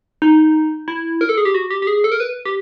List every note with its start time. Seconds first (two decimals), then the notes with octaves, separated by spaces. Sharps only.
0.22 D#4
0.88 E4
1.21 A#4
1.29 A4
1.38 G#4
1.45 G4
1.54 F#4
1.70 G4
1.82 G4
1.87 G#4
2.04 A4
2.12 A#4
2.20 B4
2.45 G4